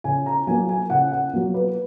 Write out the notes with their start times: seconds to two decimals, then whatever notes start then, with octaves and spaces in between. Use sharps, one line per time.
0.04 C#3 G#5
0.26 A#5
0.47 F#3 A#3 G#5
0.69 G#5
0.90 C#3 F#5
1.12 F#5
1.33 F#3 A#3
1.54 B4